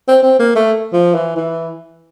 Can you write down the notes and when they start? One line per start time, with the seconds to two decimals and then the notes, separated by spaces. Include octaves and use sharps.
0.08 C4
0.23 C4
0.39 A#3
0.55 A3
0.93 F3
1.15 E3
1.36 E3